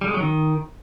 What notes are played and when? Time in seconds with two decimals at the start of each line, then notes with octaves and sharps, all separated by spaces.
0.01 G3
0.08 G#3
0.14 F#3
0.21 D#3